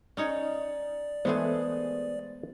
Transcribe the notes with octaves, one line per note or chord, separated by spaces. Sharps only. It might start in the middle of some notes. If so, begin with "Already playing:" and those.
C#4 D#4 C#5 D5
E3 G#3 A3 B3 G#4 C5 E5